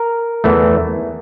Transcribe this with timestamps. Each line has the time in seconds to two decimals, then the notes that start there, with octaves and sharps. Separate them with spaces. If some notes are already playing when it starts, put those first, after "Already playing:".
Already playing: A#4
0.44 E2 E3 A3